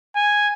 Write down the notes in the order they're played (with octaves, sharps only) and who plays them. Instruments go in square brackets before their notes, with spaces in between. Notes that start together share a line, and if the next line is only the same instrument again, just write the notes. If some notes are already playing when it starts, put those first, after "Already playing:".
[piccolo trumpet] G#5